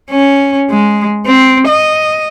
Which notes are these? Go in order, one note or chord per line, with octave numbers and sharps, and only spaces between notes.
C#4
G#3
C4
D#5